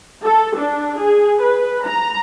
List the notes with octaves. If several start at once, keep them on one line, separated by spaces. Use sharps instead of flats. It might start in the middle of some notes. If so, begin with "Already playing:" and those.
A4
D4
G#4
B4
A#5